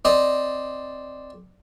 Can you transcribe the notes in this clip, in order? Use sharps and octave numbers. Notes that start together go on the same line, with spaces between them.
C4 D5 D#5